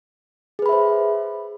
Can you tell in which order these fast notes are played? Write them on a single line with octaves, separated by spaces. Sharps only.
G#4 B4 B5 E5 C5